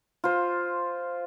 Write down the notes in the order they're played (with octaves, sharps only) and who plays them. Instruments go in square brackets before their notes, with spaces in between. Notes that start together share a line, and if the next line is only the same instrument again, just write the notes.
[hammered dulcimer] F4 C5